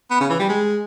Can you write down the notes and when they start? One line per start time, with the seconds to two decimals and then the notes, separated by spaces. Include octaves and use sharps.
0.11 B3
0.20 C#3
0.30 E3
0.39 G3
0.49 G#3